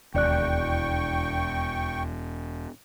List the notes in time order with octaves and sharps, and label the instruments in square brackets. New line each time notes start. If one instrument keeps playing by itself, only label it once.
[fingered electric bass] E1 [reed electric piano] D#2 D5 F#6 [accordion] G5 C#6